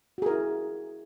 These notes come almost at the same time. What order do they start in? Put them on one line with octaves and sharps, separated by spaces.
F#4 G#4 A#4 E4